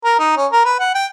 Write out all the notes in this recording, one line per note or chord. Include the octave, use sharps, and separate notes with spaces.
A#4
D#4
C#4
A#4
B4
F#5
G5